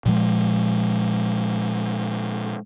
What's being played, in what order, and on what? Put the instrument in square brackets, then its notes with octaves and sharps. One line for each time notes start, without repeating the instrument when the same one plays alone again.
[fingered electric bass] A#2 F3 G#3